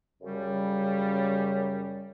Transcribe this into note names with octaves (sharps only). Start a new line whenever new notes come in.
F#2 C#3 G3 C#4